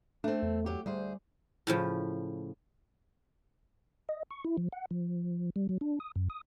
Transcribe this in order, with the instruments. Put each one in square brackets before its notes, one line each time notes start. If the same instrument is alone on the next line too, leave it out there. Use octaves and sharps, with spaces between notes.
[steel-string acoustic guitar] A3 C4 [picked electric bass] D4
[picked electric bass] E2
[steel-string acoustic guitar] F#3 G4
[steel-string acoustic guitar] D2 G#4 C5 [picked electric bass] G3
[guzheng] A2 C#3 F3
[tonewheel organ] D#5
C#6
E4
F3
F#5
F3
G3
F#3
D4
D#6
F#2
D#6